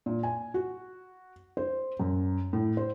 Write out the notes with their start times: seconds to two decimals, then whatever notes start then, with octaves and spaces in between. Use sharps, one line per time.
0.06 A#2
0.23 G#5
0.54 F#4
1.57 C5
2.00 F#2
2.53 A2
2.77 C5